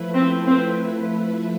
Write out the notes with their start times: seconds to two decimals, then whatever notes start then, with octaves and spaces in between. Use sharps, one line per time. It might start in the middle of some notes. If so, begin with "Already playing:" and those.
Already playing: F3 A3 E4 B4
0.14 C4
0.46 C4